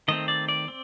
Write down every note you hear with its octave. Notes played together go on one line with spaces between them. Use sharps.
D#3 A3 C4 D#5
D5
D5
C4